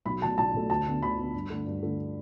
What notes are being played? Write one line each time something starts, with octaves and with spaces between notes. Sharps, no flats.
B1 B5
B2 A3 A5
B1 A5
B2 A3
D2 A5
D3 B3
D2 B5
D3 B3
G2
D3 A3
G2
D3 A3